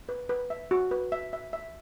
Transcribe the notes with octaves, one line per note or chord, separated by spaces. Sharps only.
B4
B4
E5
F#4
B4
E5
E5
E5